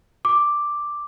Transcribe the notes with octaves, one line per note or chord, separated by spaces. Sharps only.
D6